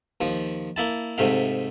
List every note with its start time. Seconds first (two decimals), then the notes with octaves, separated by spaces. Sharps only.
0.21 D#2 F3
0.76 A#3 E4 A5
1.18 G#2 C3 A3 F5